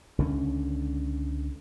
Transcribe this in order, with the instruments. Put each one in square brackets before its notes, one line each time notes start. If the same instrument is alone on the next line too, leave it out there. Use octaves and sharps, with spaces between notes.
[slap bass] C#2 D3 C#4